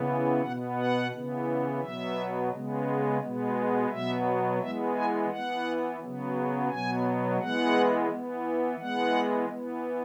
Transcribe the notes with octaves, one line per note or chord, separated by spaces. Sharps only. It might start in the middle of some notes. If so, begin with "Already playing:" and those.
Already playing: C#3 E3 B3
B2 B3 F#5
F#5
C#3 E3 B3
B2 F#3 B3 E5
C#3 G#3 B3
B2 G#3 B3
B2 F#3 B3 E5
E3 G#3 B3 E5
G#5
E3 B3 F#5
C#3 F#3 B3
B2 F#3 B3 G#5
E3 G#3 B3 F#5
E3 B3
E3 G#3 B3 F#5
E3 B3